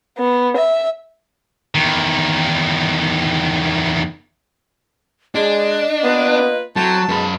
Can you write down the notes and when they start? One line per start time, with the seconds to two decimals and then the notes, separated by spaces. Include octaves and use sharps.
0.18 B3
0.57 E5
1.75 E2 D#3
5.35 G#3 D4 D#5
6.03 A#3 B3 F4 B4
6.76 F#3 C4 E4 A4 A5
7.09 F#2 B2 G#3 B5